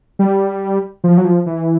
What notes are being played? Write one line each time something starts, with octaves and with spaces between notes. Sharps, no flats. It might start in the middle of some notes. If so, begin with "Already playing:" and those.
G3
F3
F#3
F3
E3